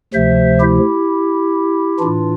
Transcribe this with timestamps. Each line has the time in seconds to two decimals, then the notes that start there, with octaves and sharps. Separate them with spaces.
0.14 D2 C3 F3 C5 E5
0.60 E4 G4
1.99 A2 E3 D4 F4